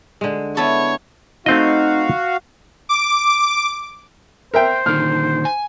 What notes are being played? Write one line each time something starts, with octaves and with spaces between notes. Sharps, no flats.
D3 G#3
B3 E4 A4 C#5
A3 C4 D#4 F#4 D#5 F5
D6
A#4 C5 E5 G5
A#2 D3 D#3 F6
G#5